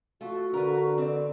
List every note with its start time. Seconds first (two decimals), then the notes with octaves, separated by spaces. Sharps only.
0.21 A3 F4 F#4
0.54 D3 A#4 B4
0.98 C4 D5